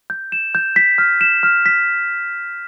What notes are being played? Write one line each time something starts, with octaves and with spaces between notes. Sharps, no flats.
G6
E7
G6
B6
F6
E7
F6
B6